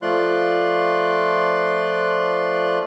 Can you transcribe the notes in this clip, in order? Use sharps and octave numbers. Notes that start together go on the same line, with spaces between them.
F3 A3 F4 D5 C6 F#6